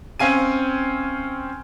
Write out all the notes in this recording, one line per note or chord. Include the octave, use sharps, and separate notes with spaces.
C4 C#4 F5 G#5 D#7